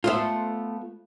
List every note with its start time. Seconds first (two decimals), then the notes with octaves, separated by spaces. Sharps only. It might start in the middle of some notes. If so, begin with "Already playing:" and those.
0.04 A3 B3 F4 C5 E5